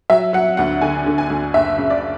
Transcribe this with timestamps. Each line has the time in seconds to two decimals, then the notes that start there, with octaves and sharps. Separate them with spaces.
0.10 F#3 E5
0.33 F#3 F#5
0.57 D2 F#5
0.81 D3 G#5
1.06 D3
1.18 G#5
1.30 D2
1.54 F#1 E5
1.78 C#3
1.90 D5